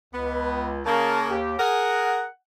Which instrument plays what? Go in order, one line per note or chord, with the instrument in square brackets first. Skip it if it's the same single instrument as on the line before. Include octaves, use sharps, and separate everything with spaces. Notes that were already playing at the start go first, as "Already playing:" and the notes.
[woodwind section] C#2 [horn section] B3
[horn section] C#3 A#3 [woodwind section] A#4 A5
[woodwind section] D#2 G4
[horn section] G#4 A#4 [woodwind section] F#5